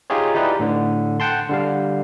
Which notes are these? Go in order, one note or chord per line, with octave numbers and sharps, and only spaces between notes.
D#4 F4 G4 G#4 C#5
D#4 E4 G4 B4 D5
A2 D3
F#5 G5 A5 C6
D3 G3 F5